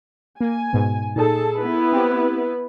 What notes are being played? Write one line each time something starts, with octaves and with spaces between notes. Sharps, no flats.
A#3 G#5
G#2 B2
A#2 D#4 G#4 A4 A5
B3 E4 B4
C4 G4